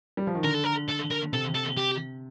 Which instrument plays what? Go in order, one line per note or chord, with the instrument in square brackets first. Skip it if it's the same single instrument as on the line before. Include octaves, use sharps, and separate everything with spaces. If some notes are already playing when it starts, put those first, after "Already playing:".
[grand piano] G3
F3
D#3
[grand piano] D3 [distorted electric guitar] A#4
[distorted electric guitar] A4
A#4
A4
A#4
[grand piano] C3 [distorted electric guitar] A4
[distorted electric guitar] A4
G4